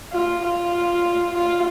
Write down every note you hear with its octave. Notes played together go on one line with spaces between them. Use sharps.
F4
F4
F4